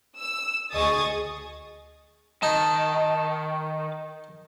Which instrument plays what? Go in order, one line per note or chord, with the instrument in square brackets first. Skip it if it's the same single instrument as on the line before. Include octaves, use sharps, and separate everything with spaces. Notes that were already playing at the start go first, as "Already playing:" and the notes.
[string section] E6
D2 G#4 D#5 C#6 D#6 A6
[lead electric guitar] D#3 [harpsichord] D#4 [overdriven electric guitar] A5